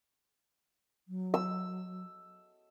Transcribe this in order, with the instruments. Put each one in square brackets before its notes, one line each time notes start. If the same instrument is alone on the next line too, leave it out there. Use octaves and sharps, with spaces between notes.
[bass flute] F#3
[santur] E6